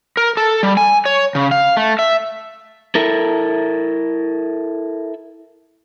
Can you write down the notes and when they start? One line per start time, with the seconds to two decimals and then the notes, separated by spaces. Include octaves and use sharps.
0.17 A#4
0.37 A4
0.63 G3
0.77 G#5
1.06 C#5
1.35 C#3
1.51 F5
1.77 A3
1.99 E5
2.95 E4 A4 A#4